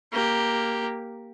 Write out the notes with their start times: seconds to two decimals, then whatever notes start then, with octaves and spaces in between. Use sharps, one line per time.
0.12 A#3 G4